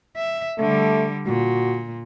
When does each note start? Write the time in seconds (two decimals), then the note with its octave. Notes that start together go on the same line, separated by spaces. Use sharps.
0.17 E5
0.59 D3 G3 A3
1.27 A#2 F#4